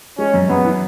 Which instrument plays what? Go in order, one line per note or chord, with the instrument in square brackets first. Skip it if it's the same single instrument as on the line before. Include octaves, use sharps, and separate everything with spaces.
[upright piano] G#3 [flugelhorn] C#4
[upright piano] F#2
[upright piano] F#2 [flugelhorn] B3
[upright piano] E3